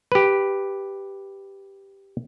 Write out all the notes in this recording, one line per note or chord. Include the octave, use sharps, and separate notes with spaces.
G4 B4